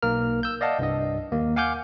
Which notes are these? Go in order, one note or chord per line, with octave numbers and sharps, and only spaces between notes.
B1 A#3 A#4 F6
E6 G6
D5 D#5 F5 F#5 A5
C2 G2 D#5
D#2 A#3
F5 F#5 G#5 D6 F6 G6